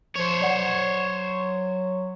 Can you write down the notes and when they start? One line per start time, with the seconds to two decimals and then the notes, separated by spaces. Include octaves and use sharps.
0.16 F3 C5 C#5
0.42 F#3 D5 F#5